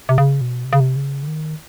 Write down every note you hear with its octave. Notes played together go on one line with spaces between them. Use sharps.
C3
C#3
B2
C3
C#3
C3
C#3
D3
D#3